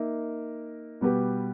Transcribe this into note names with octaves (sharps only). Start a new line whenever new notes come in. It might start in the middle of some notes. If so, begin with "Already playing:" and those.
Already playing: A#3 D#4 A#4 E5
B2 G3 B3 G4 B4